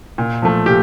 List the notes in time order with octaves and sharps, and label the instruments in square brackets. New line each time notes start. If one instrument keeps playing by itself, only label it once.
[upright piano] A#2
F3 A3
A#2 G4